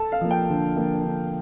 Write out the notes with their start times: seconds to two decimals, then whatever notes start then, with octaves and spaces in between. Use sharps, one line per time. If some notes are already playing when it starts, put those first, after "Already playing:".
Already playing: A4 A5
0.12 F5
0.21 F3 A#3
0.31 G5
0.49 D3
0.76 F3 A#3
1.04 D3